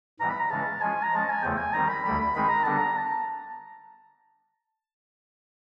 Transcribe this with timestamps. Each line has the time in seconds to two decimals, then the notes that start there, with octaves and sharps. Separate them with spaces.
0.20 G#2 E3 G3 B3 A#5
0.30 B5
0.40 A#5
0.50 C#3 E3 G#3 C#4 A5
0.81 F3 G#3 C#4 F4 G#5
1.03 A#5
1.13 F3 G#3 C#4 A5
1.29 G#5
1.43 E2 C#3 F3 A3 G5
1.58 G#5
1.73 D#3 G3 C4 D#4 A#5
1.89 B5
2.04 D2 D3 G3 B5
2.19 B5
2.35 D#3 G#3 C4 D#4 G#4 B5
2.49 A#5
2.63 D3 G3 B3 D4 A5
2.77 A#5
2.97 A5